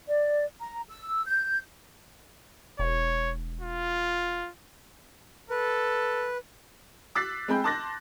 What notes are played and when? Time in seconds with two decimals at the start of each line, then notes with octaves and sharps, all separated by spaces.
0.07 D5
0.60 A#5
0.89 E6
1.26 G6
2.79 E1 C#5
3.61 F4
5.50 A4 B4
7.15 D6 E6 F#6 A6 B6 C7
7.48 G#3 C4 G#4 G5 B5 G6
7.64 A5 C6 D6 F#6 A6 A#6